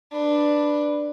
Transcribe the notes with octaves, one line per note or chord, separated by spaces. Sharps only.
D4 B4